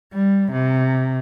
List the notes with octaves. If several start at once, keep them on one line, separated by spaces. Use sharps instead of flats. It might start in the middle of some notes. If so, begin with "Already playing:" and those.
G3
C3